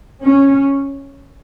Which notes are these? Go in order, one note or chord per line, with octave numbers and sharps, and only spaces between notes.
C#4